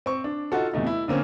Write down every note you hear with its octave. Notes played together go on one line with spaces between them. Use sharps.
C4 C#6
D4
D#4 F4 F#4 A4
E2 C3 A3 D#4
E4
D3 A#3 C4 C#4